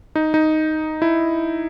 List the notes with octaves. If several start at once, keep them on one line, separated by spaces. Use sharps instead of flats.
D#4
D#4
E4